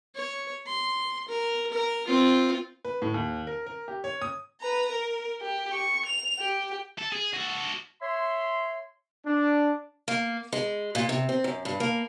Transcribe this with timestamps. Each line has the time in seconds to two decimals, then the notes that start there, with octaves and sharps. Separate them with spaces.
0.15 C#5
0.66 C6
1.28 A#4
1.72 A#4
2.07 C4 F4
2.85 B4
3.02 A2
3.14 D#2
3.47 A#4
3.66 A#4
3.88 G4
4.04 C#5
4.22 D#6
4.61 B4 A#5
4.92 A#4
5.42 G4
5.73 C#6
6.06 F7
6.40 G4
6.98 A4
7.12 G#4
7.33 F#4 A4
8.02 C#5 E5 C6
9.24 D4
10.08 A#3
10.53 G#3
10.95 A#2
11.09 C3
11.29 C4
11.44 F#2
11.65 G2
11.80 A#3